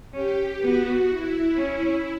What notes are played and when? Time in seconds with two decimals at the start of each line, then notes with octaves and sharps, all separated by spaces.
0.14 C#4 G4
0.61 B3 F#4
1.09 E4
1.56 C#4